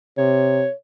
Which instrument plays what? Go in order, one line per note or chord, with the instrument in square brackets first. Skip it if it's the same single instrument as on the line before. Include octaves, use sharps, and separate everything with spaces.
[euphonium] C3 [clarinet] C#5